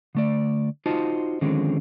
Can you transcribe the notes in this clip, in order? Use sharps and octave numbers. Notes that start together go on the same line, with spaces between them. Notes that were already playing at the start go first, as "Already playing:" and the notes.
D3 A3 D5
D#4 F4 F#4 C5 D#5 A5
D3 D#3 F3 G#3 C4 C#4